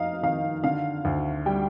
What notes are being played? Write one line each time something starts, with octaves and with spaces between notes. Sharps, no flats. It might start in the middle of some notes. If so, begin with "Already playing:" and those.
Already playing: F2 D#4 D#5 F5
D#3 F5
D3 F5
D2
G3 G5